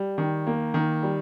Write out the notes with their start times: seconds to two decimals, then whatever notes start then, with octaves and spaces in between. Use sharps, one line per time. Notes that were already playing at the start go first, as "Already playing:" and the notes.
Already playing: G3
0.18 D#3
0.47 A#3
0.74 D#3
1.03 G3